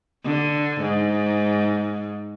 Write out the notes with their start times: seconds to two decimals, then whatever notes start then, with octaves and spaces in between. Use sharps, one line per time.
0.24 D3
0.81 G#2